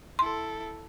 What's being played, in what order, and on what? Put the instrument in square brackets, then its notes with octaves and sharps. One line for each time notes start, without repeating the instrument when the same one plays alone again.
[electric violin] E4 A4 [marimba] C6